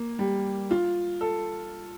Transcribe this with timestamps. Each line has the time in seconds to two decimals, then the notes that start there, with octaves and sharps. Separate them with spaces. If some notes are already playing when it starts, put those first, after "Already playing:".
Already playing: A#3
0.19 G3
0.71 F4
1.21 A4